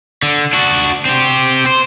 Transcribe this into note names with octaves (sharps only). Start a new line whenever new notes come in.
D3
D4 F#4
C4 G4
C5